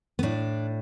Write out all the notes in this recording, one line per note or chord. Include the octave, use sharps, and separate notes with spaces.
B3
A2 D4